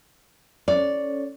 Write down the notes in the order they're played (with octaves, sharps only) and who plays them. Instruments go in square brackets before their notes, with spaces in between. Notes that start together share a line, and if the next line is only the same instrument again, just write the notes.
[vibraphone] C#4 A4 C#5 [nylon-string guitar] D5